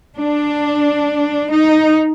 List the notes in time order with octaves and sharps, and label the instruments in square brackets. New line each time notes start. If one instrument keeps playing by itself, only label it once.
[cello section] D4
D#4